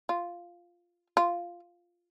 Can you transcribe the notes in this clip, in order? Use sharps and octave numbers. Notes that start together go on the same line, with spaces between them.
F4
F4